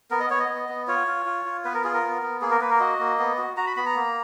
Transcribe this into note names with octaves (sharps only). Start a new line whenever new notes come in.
B3 A#4
D#5
B3 C#5
D#5
B3
B3
F4 C#5
F4
F4
F4
B3 B4
A#4
F4 G#4
A#4
B3
B3
A#3 G#4
A#4
A#3 B4
A#4
F#4 D#5
A#3
B3
F#4
F#4 A#5
B5
B3 B5
A#5
A#3